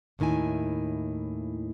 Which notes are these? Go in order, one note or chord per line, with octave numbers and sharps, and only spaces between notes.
D#2 A2 D#3 E4 G#5